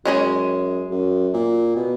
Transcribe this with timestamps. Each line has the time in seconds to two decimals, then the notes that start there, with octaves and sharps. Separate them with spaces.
0.05 F#2 G#3 C#4 G#4 D#5
0.90 F#2
1.34 A#2
1.76 B2